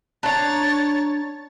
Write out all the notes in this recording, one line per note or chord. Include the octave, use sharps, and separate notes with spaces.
D4 C#5 A#5 A6